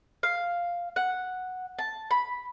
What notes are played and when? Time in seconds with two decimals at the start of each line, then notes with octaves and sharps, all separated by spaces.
0.23 F5
0.96 F#5
1.79 A5
2.11 B5